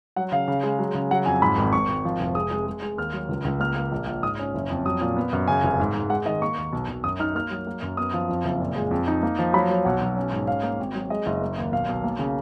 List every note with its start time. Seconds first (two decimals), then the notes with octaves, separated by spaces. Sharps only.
0.16 F#3 F#5
0.32 C#3 F5
0.48 C#3
0.63 G#3
0.79 F#3
0.95 C#3
1.11 F#3 F#5
1.26 F2 G#5
1.42 G#2 B5
1.58 G#1
1.73 G#1 C#6
1.88 G#1
2.05 F3
2.20 F1
2.35 G#3 D#6
2.51 G#3
2.67 G#3
2.82 G#3
2.98 D#2 F6
3.13 F#3
3.29 C#2
3.45 C#2
3.60 A#3 F6
3.76 A#3
3.92 A#1
4.07 A#1
4.23 G#2 D#6
4.39 C#4
4.54 F#1
4.70 F2
4.86 F#3 D#6
5.01 A#2
5.17 B3
5.33 F#2
5.48 C#3 G#5
5.63 F1
5.80 G#2
5.95 G#2
6.10 G#3 F#5
6.26 D#3 D#5
6.42 A#3 C#6
6.57 D#2
6.73 B1
6.88 B1
7.04 F#2 D#6
7.20 D#4 F6
7.35 A#3 F6
7.51 F#3
7.67 A#3
7.82 F#2
7.97 B3 D#6
8.13 F3
8.29 F2
8.45 F#1
8.60 A#2
8.76 G#3
8.91 F2
9.08 D#4
9.23 A#3
9.39 F3
9.53 F#3 B5
9.69 F#3
9.85 B1 F#5
10.01 B1
10.16 C#4
10.32 G#2
10.47 C#4 F5
10.63 A#3
10.80 G#1
10.94 F#3
11.10 G#3 D#5
11.26 F#1
11.41 A#3
11.58 D#2
11.72 B1 F5
11.89 B1
12.04 A#3
12.19 C#3